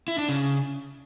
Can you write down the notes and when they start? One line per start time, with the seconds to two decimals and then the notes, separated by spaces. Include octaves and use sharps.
0.08 E4
0.18 D4
0.29 C#3